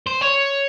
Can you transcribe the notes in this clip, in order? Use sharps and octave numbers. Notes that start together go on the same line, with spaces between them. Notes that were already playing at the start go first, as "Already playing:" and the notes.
C5
C#5